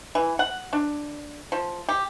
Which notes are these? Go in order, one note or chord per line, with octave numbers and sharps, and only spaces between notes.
E3
F#5
D4
F3
G4